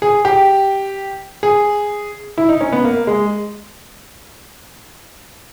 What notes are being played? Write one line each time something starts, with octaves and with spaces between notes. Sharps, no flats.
G#4
G4
G#4
E4
D#4
C#4
B3
A#3
G#3